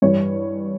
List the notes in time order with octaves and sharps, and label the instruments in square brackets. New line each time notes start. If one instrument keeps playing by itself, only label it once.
[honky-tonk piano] G2 E3 G3 C#5